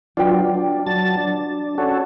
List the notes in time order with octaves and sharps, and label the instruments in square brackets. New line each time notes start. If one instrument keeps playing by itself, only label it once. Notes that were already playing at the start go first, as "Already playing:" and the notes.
[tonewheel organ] F#3 D4 [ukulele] F4 B4 G5
[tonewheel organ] D4
F#3 A5 A6
D4
C#4 F#4 A4